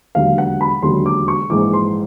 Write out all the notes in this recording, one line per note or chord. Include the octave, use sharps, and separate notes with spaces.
E1 D#2 D3 F#3 F5
F#5
B5
E1 D#2 D3 F#3 C6
D6
C#6
A#1 G#2 E3 D6
C6